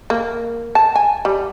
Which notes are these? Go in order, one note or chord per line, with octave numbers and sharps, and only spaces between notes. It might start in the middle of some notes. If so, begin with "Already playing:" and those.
A#3
A5
G#5
G3